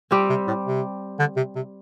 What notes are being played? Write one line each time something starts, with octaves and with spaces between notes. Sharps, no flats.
G3 C4 G4
C3
A2
C3
D3
C3
C3